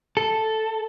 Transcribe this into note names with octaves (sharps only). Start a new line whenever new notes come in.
A4